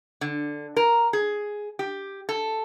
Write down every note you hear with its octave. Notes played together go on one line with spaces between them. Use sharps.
D3
A#4
G#4
G4
A4